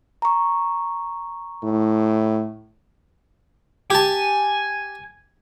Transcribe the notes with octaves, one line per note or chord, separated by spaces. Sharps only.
A#5 C#6
A2
G4 G#5 A5